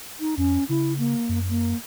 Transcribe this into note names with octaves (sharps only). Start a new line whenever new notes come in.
D#4
F2 C#4
C#3 E4
A#3
F#2
A#3